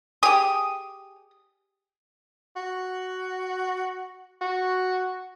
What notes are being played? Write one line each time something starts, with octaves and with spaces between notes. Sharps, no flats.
G4 G#4 D#6
F#4
F#4